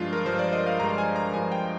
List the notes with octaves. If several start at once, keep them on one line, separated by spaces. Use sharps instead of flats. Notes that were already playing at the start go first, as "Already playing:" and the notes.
Already playing: G2 F3 G#3 D4 F4
A#4
G2 F3 G#3 C5
D5
D#5
F5
G2 F3 G#3 A#5
G#5
A#5
G2 F3 G#3 G#5
G5